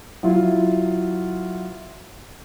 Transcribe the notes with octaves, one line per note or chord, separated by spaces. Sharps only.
F#3 E4 F4